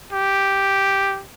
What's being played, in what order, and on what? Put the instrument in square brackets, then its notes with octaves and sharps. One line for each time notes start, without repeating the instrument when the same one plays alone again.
[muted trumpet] G4